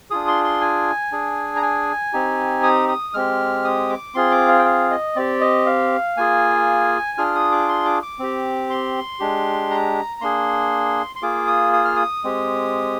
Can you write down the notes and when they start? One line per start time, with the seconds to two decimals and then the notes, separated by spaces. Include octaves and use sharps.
0.10 D4 F4 G#4 D#6
0.28 C6
0.44 C6
0.61 G#5
1.12 D4 G#4
1.56 A#5
1.62 G#5
2.13 C4 D#4 G4
2.63 D#6
2.89 D#6
3.14 G#3 C4 G4 F6
3.64 D#6
3.90 D6
4.15 C4 F4 G#4 C6
4.32 D6
4.48 F5
4.59 G5
4.65 F5
4.91 D#5
5.16 C4 G4 D5
5.41 D#5
5.66 F5
6.17 A#3 F4 G#4 G#5
7.18 D4 F4 G#4 F6
7.35 D#6
7.52 D6
7.69 C6
7.85 D6
8.03 D6
8.19 C4 G4
8.70 C6
9.20 G#3 D4 G4
9.71 A#5
10.21 A#3 D4 G#4 C6
11.16 C6
11.22 A#3 F4 G#4 D6
11.47 D#6
11.73 D#6
11.85 F6
11.96 D#6
12.24 G#3 C4 G4